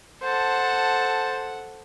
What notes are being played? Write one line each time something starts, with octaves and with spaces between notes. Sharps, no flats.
A4 C5 F#5 A5